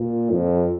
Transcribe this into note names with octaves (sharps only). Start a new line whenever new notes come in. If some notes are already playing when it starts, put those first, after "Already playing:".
Already playing: A#2
F2